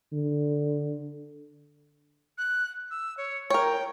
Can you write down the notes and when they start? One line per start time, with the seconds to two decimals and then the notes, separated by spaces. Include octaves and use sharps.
0.12 D3
2.38 F#6
2.91 E6
3.17 C#5
3.50 A#4 C#5 G5